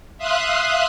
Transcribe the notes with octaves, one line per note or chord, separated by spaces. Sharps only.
E5 F5 C6 D#6 F#6